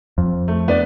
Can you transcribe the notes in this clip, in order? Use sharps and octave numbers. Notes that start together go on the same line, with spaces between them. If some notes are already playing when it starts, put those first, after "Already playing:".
F2
A3
B3 D4 D5